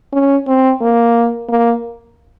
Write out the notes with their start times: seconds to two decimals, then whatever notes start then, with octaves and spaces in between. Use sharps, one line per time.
0.12 C#4
0.47 C4
0.81 A#3
1.49 A#3